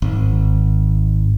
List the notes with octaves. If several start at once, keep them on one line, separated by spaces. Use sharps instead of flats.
G#1